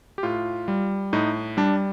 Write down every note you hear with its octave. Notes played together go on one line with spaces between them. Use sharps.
G4
A2 F4
G3
A2 D#4
G3 D4